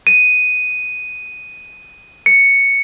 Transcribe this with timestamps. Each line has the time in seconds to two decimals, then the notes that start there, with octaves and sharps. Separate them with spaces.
0.07 D#7
2.26 C#7